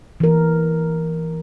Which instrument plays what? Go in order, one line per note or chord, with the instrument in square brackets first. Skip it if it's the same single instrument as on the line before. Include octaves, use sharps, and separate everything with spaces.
[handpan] E3 A#4